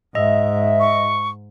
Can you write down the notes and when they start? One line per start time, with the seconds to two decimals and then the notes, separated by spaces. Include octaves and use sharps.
0.15 G#2 D#5 E5
0.80 C#6